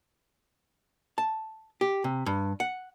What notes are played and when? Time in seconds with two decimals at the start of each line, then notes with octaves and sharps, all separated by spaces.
1.18 A5
1.81 G4
2.04 C3
2.26 G2
2.60 F#5